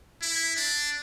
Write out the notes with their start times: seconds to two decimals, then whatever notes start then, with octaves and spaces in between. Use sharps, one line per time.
0.22 E4
0.56 D4